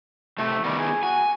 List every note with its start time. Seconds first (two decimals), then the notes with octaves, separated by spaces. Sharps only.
0.38 A2 C3 A3 C4
0.64 D#3 G3 B3 A#4
0.79 G#4
1.03 F#4 G#5